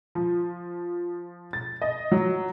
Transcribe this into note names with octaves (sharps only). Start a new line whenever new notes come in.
F3
A6
D#5
F#3